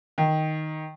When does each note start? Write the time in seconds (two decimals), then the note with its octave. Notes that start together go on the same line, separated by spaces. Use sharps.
0.18 D#3